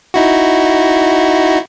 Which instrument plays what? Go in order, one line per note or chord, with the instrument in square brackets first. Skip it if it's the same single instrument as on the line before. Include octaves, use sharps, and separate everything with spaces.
[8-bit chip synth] D#4 E4 F#4